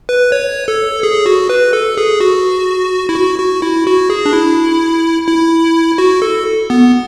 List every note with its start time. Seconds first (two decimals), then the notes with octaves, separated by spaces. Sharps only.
0.09 B4
0.32 C#5
0.68 A4
1.03 G#4
1.26 F#4
1.49 B4
1.73 A4
1.97 G#4
2.20 F#4
3.09 E4
3.15 F#4
3.39 F#4
3.62 E4
3.87 F#4
4.10 G#4
4.26 D4
4.33 E4
5.28 E4
5.98 F#4
6.22 A4
6.70 B3